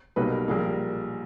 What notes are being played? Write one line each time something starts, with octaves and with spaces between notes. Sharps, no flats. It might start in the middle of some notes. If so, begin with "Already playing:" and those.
B1 B2 G3 A#3 B4
A#4
A#1 A#2 G3 A#3 G#4
A#4